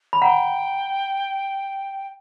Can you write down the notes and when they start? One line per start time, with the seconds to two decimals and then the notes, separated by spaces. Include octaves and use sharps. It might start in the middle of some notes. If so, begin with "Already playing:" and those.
0.13 B5
0.22 F#5 G5 A#5